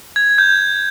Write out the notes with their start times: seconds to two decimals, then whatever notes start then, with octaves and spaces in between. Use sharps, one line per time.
0.16 G#6
0.38 G6